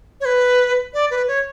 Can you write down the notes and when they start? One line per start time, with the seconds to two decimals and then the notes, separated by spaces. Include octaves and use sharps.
0.21 C#5
0.25 B4
0.94 D5
1.11 B4
1.28 C#5